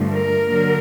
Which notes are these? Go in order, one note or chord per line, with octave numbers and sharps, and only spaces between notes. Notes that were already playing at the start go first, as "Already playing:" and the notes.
Already playing: G2 D3 F3 A3
A#4
D3 F#3 A#3